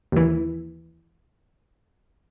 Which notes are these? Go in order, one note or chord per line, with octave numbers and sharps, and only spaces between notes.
D#2 E3